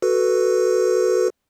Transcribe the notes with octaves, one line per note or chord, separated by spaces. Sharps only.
F#4 A4 B4